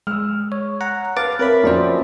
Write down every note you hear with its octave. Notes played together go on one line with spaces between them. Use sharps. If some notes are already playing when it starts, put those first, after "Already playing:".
G#3 E6 F6
C#5
F#5 A#5
B4 F5 A5 D6 F6 A6
C4 A#4 B4 C#5 E5 B5
F2 F#3 A#3 C#4 C5 D5